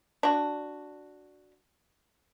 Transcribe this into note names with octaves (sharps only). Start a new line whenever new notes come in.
D4 F#4